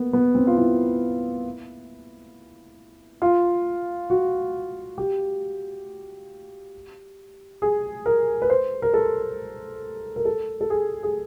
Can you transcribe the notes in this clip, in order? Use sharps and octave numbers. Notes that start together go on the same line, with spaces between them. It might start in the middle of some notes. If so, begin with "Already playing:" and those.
Already playing: A#3 B3
B3
C4
F4
E4
F4
F#4
G4
G#4
A#4
B4
C5
A#4
A4
A#4
A4
A4
G#4
G#4